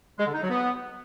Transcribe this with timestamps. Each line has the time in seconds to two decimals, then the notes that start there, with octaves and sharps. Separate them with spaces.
0.18 G#3
0.26 D3
0.34 D#4
0.42 F#3
0.49 B3